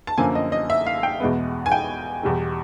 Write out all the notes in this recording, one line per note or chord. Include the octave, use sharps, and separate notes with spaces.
A5
F#2 D3 F3 A#3 G#5
D#5
D#5
E5
F5
G5
E2 B2 G#3 B3
G#5
G5
E2 B2 G3